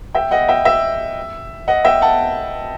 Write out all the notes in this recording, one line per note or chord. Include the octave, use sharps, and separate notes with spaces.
E5 G5
D#5 F#5
E5 G5
E5
D#5 F#5
E5 G5
F#5 A5